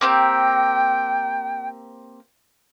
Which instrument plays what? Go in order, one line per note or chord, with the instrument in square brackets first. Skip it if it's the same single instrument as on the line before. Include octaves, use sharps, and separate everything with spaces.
[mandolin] A#3 C4 G4 [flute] G5